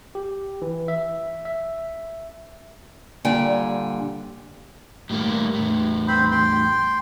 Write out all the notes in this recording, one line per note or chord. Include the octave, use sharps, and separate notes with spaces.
G4
E3
E5
E5
A#2 D3 G3 G5 G#5
A2 G3 A#3
E2 A2
C4 C5 B5
G5 C6